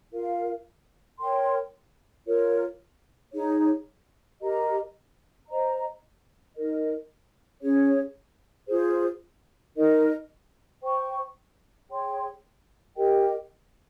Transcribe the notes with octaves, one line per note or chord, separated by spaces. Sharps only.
F4 A#4 F5
A#4 C#5 G5 C6
F4 A#4 C#5
D#4 G#4 C#5
G4 A#4 D#5 A#5
C5 D#5 A#5
D#4 A#4 D#5
C#4 G#4 C#5
F4 G#4 C5
D#4 A#4 D#5
C5 G5 C#6
G#4 C#5 G5 C6
G4 A#4 D#5 G5